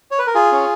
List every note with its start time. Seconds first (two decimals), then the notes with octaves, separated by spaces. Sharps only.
0.11 C#5
0.19 B4
0.27 A#4
0.35 F4 G#4
0.52 C#4